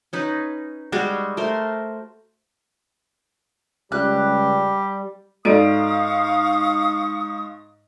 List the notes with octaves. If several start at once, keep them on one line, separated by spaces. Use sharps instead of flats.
C#4 D#4 B4
G3 G#3 F#4 G#4
A3 A#4 C5 C6
C#2 G3 G4 F#6
G#2 F#4 A4 D5 F5 C#6 D#6 D7